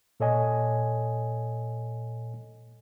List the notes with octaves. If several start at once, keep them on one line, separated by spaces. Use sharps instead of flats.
A#2 A4 C#5 D#5 G#5